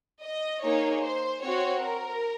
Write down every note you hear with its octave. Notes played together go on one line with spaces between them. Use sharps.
D#5
A#3 D#4 G#4 C#5
C5
C4 F#4 C#5
A#4